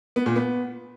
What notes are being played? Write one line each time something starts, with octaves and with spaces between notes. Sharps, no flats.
B3
A#2
B3